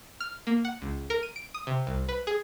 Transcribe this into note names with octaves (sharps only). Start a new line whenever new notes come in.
F6
A#3
F#5
C#2
A#4
D#7
D7
D#6
C3
C2
B4
G#4